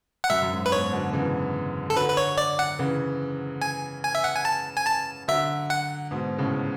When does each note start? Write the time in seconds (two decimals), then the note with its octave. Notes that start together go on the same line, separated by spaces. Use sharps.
0.24 F#5
0.30 F#2 E5
0.42 F#2
0.51 G#2
0.66 B4
0.71 G#2 B2 C#5
0.93 B2 D3
1.13 C#3 E3
1.90 A4
1.96 D3 F#3 B4
2.09 B4
2.17 C#5
2.38 D5
2.59 F#5
2.79 C#3 E3
3.61 G#5
4.04 G#5
4.15 E5
4.24 F#5
4.35 G#5
4.45 A5
4.77 G#5
4.87 A5
5.28 D3 F#3 E5
5.70 F#5
6.11 G#2 B2
6.38 A2 C#3